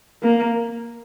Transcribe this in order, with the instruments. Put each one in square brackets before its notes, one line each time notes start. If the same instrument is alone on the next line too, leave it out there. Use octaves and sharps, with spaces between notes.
[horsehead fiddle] A#3